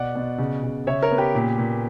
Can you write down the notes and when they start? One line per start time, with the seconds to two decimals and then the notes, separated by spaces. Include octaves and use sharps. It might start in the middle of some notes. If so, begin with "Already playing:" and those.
Already playing: B2 D5 F#5
0.15 B2
0.38 C#3
0.63 C#3
0.86 C#3 C#5 E5
1.02 A#4 C#5
1.11 B3
1.18 G4 B4
1.35 A#2
1.59 A#2